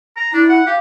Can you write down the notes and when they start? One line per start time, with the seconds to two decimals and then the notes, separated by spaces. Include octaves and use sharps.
0.17 A#5
0.34 D4 E4
0.49 F#5
0.67 G4 F5